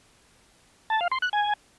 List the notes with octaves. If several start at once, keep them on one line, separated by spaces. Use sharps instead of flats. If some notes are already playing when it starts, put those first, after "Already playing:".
A5
F5
C6
F#6
G#5